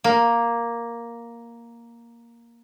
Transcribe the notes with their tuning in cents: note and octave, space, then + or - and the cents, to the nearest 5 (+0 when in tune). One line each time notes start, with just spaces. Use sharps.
A#3 +5